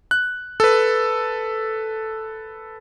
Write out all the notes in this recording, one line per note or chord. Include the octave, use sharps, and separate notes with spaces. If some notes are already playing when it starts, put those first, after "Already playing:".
F#6
A4 B4